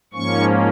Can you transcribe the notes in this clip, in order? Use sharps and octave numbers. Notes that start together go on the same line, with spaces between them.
G#2 F3 A#3 C#4 C#6